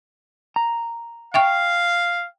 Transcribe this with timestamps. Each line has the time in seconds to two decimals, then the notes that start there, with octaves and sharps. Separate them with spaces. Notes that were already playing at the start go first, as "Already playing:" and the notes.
0.56 A#5
1.34 E5 F5 G5 C#6